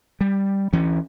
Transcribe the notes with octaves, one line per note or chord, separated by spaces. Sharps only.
G3
D2 E3 C#4